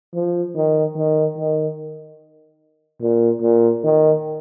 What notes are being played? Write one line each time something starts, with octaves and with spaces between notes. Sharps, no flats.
F3
D#3
D#3
D#3
A#2
A#2
D#3